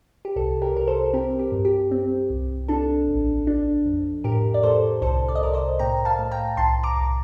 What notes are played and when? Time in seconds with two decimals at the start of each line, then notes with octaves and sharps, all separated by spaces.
0.25 G4
0.36 C2 A4
0.62 G4 A#4
0.75 C2 A#4
0.87 A4 C5
1.13 C4 G4 A#4
1.39 G4
1.52 G2
1.65 G4
1.91 C4
2.30 C2
2.68 D4 A4
3.08 A1
3.47 D4
3.86 F2
4.24 A2 G4 A#4
4.54 D5
4.63 A2 A4 C5
5.02 C2 A4 C5
5.28 D5
5.35 D#5
5.41 C2 A#4 D5
5.54 C5 D#5
5.79 A2 G5 A#5
6.05 F5 A5
6.19 A2
6.31 G5 A#5
6.57 C2 A5 C6
6.83 A#5 D6
6.96 C2